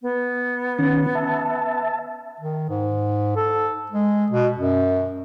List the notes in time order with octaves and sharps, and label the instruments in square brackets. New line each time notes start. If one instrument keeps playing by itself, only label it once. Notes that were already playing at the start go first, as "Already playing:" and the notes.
[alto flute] B3
[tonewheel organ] D#3 C#4
E5 A5
[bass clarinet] D#3
G#2
A4
G#3
B2
F#2